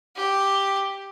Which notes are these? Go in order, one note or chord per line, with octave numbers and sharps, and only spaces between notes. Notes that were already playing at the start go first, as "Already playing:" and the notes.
G4